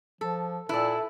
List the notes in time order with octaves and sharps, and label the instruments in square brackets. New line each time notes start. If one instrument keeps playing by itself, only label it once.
[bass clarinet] F3 [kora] A4
[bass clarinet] A#2 [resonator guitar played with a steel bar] E4 [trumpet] A4 [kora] B4 D5